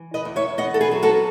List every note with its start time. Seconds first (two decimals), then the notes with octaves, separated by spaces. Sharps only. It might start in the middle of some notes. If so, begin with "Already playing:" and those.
Already playing: E3
0.14 B4 D#5
0.25 E2
0.36 C#5 E5
0.58 B3 D#5 F#5
0.74 A4
0.81 G#4 B4
0.91 F#3
1.03 F#4 A4